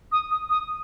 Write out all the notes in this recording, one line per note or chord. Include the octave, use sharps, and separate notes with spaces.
D#6
D#6
D#6